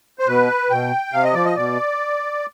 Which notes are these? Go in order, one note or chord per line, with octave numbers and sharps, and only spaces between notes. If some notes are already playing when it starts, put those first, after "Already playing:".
C5
B2 B4
B2 G5
C3 F5
D#5
F3 D5
D#5
B2 D5